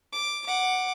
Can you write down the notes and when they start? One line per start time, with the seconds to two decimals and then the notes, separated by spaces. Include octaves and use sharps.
0.13 D6
0.46 F#5 D6